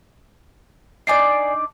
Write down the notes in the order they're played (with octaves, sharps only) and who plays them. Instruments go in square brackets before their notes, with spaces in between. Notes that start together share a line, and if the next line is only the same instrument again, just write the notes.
[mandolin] D4 D#4 D6 [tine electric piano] D5 G#5 C7